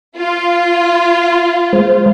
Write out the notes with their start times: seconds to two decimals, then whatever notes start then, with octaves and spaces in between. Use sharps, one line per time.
0.17 F4
1.73 G#3 C5